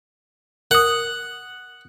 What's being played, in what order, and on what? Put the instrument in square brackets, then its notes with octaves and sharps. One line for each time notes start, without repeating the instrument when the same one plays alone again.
[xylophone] A#4 D#6 [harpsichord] F#5